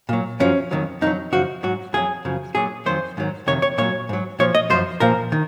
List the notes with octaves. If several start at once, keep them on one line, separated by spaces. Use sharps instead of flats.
A#2 F#3
F#2 F3 C#4
F2 C3 D#3 F#3
F2 D#3 D#4
F#3
F#2 C#3 F3 F#4
G#2 F#3 F#4
F2 D#3 F#3 G#4
F#2 C#3 F3
A#2 F#3 G#4
F2 D#3 F#3 C5
G#2 D#3 F#3
F2 C3 D#3 C#5
C#5
A#2 F#3 C#5
G#2 F#3
A#2 F3 C#5
D#5
F#2 F3 C5
A#2 F3 A#4
D#3